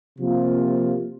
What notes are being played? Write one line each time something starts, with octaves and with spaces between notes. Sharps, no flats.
C3 F3 A#3 F4